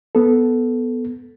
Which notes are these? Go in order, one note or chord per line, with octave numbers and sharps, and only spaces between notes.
B3 A4